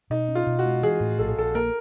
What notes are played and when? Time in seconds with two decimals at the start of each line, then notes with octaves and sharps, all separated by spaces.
0.10 B2 D#4
0.28 C#4
0.35 F4
0.47 B2
0.59 F#4
0.65 G#3
0.82 E3 G#4
1.00 A2
1.19 A#1 A4
1.28 G#4
1.37 A#1 A4
1.55 A#3 A#4